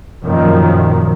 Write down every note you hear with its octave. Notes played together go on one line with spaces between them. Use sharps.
F#2 A#2 D#3 F3